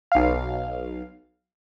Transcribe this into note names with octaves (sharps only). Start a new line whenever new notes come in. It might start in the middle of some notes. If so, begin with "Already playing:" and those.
B1 F5